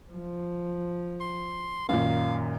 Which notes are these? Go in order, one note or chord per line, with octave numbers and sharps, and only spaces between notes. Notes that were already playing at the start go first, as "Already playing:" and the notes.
F3
C6
F#2 A#2 D#3 F5